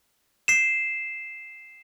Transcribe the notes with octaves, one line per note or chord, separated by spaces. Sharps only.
C7 E7